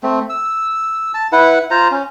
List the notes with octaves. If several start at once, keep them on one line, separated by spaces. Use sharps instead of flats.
A3 C4
E6
A5
E4 B4 F#5
F4 C5 A#5
C#4